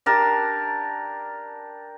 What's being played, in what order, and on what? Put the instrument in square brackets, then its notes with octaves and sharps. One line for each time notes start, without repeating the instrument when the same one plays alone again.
[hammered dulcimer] D4 G4 A#4 A5